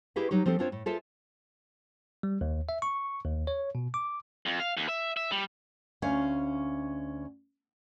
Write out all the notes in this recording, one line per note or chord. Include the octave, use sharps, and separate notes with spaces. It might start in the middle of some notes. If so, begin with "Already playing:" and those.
E4 G4 G#4 B4 D#5 F5
F#3 D#4 G4
F3 C4 G4 A4
C4 D4 F4 C5 C#5
A2
F4 G#4 A4 C5 E5
G3
D#2
E5
C#6
D#2
C#5
B2
D6
F2
F5
D#2
E5
E5
G3
D2 C#4 F5